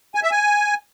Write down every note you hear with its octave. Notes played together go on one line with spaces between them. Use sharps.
G#5
E5
G#5